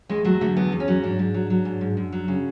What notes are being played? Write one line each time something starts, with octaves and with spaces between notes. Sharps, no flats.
E2 G#3
F#3 A3
D3 A3
E2 B3
E2
C#4
F#3
G#2 D4
G#2
F#3
F#3
G#2
G#2
F#2
F#3
C#3